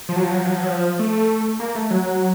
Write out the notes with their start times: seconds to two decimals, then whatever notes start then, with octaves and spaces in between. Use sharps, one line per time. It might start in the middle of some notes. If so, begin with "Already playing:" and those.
0.09 F3
0.16 F#3
0.23 F3
0.31 F#3
0.38 F3
0.46 F#3
0.53 F3
0.60 F#3
0.68 F3
0.99 A3
1.60 A#3
1.75 A3
1.90 F#3